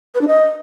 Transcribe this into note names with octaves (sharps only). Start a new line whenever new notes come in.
B4
D4
D#5